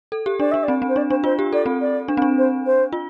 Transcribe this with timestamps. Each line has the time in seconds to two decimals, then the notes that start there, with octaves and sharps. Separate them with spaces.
0.12 A4
0.26 G4
0.39 D4 D5
0.51 D4 E5
0.63 D5
0.68 C4
0.82 C4
0.88 C5
0.96 D4 D5
1.10 D4 C5
1.24 F4 C5
1.39 G4
1.53 A4 D5
1.66 C4
1.81 D5
2.08 D4
2.17 C4
2.22 D4
2.37 C5
2.65 C5
2.93 F4